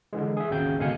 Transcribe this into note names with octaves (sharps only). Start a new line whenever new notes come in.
D3 E3 G#3
G#4 E5
G#1 D#2 C#3 F#4 G5 G6
G#1 B2 D3 F5 G#5 C#7